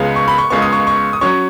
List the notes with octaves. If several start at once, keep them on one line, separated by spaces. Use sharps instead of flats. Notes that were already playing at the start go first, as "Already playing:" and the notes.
Already playing: C#2 C#3 G#3 B3
C#6
B5
C#6
C#2 C#3 G#3 B3 C#6
D#6
C#6
C#6
D#6
F#3 C#4 C#6